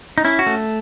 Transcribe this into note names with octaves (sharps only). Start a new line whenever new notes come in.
D#4
C#4 E4
F#4
A3